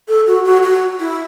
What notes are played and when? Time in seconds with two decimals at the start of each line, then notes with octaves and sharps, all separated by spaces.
0.08 A4
0.27 F#4
0.45 F#4
0.63 F#4
1.00 E4